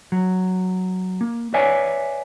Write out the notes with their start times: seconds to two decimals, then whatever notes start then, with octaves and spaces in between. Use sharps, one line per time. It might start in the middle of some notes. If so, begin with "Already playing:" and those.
0.12 F#3
1.21 A#3
1.54 B4 C#5 D5 E5 G#5